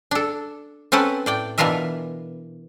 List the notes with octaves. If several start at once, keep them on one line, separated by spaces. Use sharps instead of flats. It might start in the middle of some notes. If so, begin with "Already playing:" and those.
D4 A4
C4 C#4 A4 B4 F#5
A2 D5 G5
B2 E3 D4 F4 A#4 E5